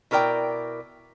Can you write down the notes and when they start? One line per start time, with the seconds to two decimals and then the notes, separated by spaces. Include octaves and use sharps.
0.11 B2 E4 A#4 D5 G5